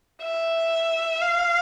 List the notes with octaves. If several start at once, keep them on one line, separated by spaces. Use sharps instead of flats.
E5
F5